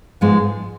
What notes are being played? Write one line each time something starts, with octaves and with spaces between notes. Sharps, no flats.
G#2 F3 G#3 B3